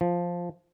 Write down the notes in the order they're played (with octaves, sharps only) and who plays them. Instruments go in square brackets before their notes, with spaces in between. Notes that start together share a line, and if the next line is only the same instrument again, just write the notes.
[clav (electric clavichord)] F3